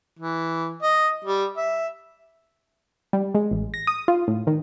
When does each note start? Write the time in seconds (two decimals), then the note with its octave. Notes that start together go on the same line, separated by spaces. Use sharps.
0.19 E3
0.82 D#5
1.25 G3
1.57 E5
3.13 G3
3.35 G#3
3.51 A1
3.74 A#6
3.87 D#6
4.08 F4
4.28 A2
4.47 D#3